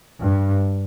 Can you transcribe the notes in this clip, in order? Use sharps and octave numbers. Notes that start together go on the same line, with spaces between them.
G2